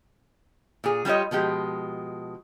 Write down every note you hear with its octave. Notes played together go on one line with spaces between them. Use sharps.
A#2 G#4
G3 F4 G4 C#5 D#5
B2 F3 G#3 G4